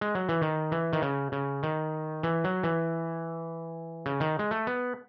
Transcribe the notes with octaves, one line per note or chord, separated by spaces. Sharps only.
G#3
F#3
E3
D#3
E3
D#3
C#3
C#3
D#3
E3
F#3
E3
C#3
D#3
G#3
A3
B3